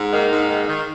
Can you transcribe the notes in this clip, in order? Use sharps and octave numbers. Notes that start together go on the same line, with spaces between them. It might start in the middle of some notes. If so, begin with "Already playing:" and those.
Already playing: G#2
D#3 A#3
G#2
D#3
D#3